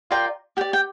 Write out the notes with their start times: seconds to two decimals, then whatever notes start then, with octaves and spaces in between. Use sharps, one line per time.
0.11 F4 A#4 D5 G5 C6
0.57 G4 G5
0.61 D5
0.73 G5